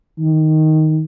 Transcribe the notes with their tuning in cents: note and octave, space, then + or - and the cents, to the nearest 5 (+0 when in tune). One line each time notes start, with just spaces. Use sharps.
D#3 +5